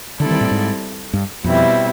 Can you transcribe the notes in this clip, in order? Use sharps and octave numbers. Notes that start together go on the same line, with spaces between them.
D3 G3 C4 E4 A4 D5
D#3
A2
G#2
G2
F2 B2 G3 C4 E4